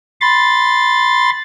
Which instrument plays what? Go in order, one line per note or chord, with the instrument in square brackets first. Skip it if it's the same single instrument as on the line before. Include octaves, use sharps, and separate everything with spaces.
[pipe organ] B5 C6 A6